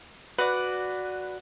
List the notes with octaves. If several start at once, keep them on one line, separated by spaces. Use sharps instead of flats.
F#4 B4 D5